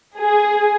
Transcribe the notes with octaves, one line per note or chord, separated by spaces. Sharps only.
G#4